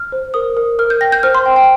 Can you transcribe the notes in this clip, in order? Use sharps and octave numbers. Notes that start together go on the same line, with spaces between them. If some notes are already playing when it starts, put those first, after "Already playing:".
Already playing: F6
C5
A#4 D#6
A#4
A#4 F6
G6
G5 A#6
G6
C5 F6
C6
G5
G5